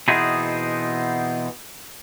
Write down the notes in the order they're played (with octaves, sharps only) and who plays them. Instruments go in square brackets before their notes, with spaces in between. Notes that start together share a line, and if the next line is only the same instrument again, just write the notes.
[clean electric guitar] B2 E3 B3 C4 D#4 G#4